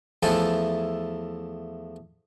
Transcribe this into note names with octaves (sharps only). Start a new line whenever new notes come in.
E2 F3 A3 E4 G#5 A5